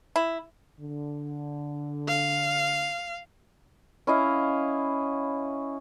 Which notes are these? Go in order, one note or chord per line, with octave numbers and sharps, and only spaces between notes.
E4
D3
F5
C#4 E4 D#5 F5